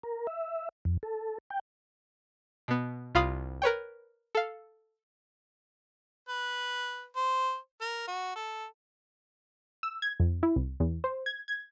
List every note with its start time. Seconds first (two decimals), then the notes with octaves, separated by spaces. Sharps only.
0.03 A#4
0.27 E5
0.85 F2
1.03 A4
1.50 G5
2.68 B2 B3
3.15 C2 F4 F5 B5 D#6
3.62 A#4 B4 C#5 G5
4.35 A4 F5
6.29 B4
7.16 C5
7.81 A#4
8.08 F#4
8.36 A4
9.83 E6
10.02 G#6
10.20 F2
10.43 E4
10.56 C2
10.80 E2
11.04 C5
11.26 G#6
11.48 G#6